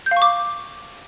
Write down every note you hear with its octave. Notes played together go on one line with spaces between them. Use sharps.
G6
F5
C#6
D6